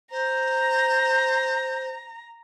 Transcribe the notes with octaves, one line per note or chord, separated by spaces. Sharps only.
C5 A#5